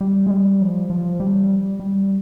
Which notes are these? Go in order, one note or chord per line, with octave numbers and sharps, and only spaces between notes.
G3
G#3
G3
F3
F3
G3
G3